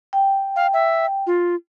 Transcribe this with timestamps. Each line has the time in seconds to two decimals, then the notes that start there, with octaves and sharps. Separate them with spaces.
0.13 G5
0.56 F5
0.73 E5
1.27 F4